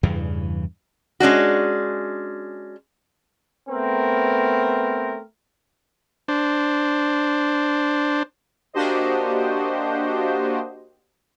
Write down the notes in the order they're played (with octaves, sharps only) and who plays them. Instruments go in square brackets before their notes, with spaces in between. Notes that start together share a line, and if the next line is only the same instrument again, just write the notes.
[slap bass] E2 G2 C#3 E3
[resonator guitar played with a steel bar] G#3 C#4 D4 F#4
[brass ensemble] A3 B3 C4 A#4
[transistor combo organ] D4 C5
[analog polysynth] A#3 D4 F#4 G4 C5 D#5